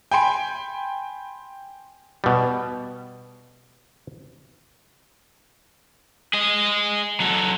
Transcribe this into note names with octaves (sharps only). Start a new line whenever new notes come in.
G5 G#5 B5 C6 D7
B2 G3
G#4 D#5
F#3 A4